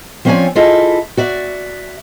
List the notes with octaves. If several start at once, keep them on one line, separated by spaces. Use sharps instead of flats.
F3 C4 C#4 C#5 D5 G#5
E4 F4 G#4 A4 D#5 E5
F#4 D5 E5